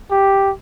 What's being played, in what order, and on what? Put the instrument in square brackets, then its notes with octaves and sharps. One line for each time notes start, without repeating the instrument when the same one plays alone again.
[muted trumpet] G4